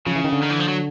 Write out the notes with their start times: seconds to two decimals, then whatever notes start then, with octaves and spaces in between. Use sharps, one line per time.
0.07 C#3 F3
0.16 E3
0.24 D#3
0.33 D3
0.43 D#3
0.50 E3
0.60 F3
0.68 F#3